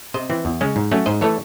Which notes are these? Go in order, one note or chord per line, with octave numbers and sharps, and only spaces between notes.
C3 C5 D#5
E3 C4
E2
C#3 G#3 C#4
G#2
F#3 A3 C#4
G#2 C5 D#5
E3 A3 A4 C#5